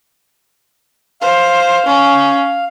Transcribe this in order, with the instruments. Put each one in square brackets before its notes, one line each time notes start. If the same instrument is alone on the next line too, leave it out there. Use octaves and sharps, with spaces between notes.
[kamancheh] C5 [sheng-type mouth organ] F5
[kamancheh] C#4